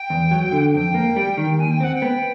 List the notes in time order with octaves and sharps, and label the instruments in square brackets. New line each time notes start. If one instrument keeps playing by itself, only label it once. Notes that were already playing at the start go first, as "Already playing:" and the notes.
Already playing: [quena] G5
[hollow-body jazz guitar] E2
F#3
D3
[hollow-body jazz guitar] F2 [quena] G5
[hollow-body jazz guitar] A#3
G3
D#3
[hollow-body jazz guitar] D#2 [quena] G#5
[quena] G5
[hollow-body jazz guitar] C4 [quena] F#5
[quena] G5
[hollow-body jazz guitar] B3